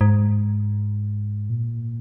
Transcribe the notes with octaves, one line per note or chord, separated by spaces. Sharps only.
G#2
A#2